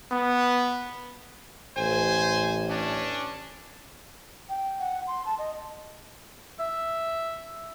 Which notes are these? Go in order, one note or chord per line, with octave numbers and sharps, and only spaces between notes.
B3
A1 C5 G#5
C#4 D4
G5
F#5
C6
A5
D#5
E5